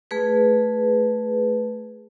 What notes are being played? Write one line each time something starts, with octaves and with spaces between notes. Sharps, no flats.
A3 G#4 B4